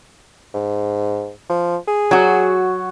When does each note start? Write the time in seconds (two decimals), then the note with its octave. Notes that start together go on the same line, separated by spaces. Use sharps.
0.54 G#2
1.49 F3
1.87 G#4
2.11 F#3 F#4